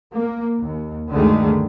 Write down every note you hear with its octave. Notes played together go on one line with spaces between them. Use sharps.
A#3
D#2
D2 G2 D3 D#3 G#3 A3